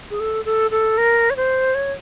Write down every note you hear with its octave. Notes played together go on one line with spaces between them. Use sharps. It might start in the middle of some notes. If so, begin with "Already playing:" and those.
G#4
A4
A4
A4
A#4
C#5
C5
C#5